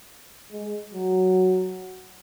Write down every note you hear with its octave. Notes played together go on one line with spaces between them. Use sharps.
G#3
F#3